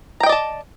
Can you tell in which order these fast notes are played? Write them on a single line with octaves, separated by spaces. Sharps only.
A#5 G5 D#5 D5 A5